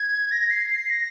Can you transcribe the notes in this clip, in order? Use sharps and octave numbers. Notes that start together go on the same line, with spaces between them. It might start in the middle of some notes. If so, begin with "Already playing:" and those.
Already playing: G#6
A#6
C7
C7
A#6